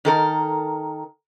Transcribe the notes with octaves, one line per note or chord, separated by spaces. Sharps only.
D#3 A4 A#4